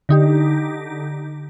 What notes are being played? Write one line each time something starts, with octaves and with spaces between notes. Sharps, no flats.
D3 D#4 G4